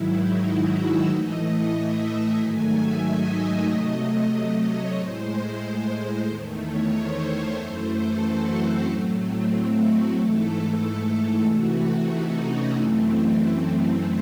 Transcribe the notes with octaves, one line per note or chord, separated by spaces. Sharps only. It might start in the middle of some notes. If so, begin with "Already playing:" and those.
Already playing: G#2 D#3 F#3 E4
D#4
F#4
E5
A2 E3 A3 D#5
E5
D#5
G#2 D#3 F#3 A3 G#5
E5
D#5
C3 F#3 A3
D#5
C#5
A2 G#3 C5
E2 D#3 A3
C#5
C5
F#2 E3 A3 C5
A4
F#4
C4
A2 F#3 A3
C4
C4
F#4
G#2 E3 A3 A4
C3 E3 A3 F#4
F#4
D#4
C#4
F#2 E3 A3 C4